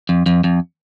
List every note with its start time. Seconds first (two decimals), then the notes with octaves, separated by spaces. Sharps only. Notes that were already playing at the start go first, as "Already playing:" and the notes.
0.09 F2
0.26 F2
0.44 F2